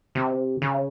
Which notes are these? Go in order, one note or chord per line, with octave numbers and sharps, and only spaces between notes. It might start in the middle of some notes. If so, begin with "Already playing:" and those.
C3
C#3